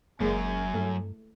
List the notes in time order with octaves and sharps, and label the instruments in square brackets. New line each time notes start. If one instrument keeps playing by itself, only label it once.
[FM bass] F#1 [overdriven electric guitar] F#2 [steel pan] G#3 A#3 [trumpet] G#5
[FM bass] G2 [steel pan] A3